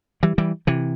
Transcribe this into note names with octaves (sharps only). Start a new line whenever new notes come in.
E3 G3
E3 G3
C3 E3